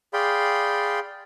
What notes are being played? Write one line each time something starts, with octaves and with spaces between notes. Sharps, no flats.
G#4 D5 F5 G5 B5 C6